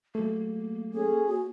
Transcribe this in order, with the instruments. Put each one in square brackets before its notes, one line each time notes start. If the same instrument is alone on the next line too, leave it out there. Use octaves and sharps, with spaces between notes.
[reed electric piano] F#3 A3 [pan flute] A#3
[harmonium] C#4 G#4 [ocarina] A4
[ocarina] F#4